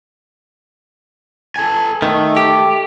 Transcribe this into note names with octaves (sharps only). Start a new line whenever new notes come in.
A4 G#5
D#3 A3
G4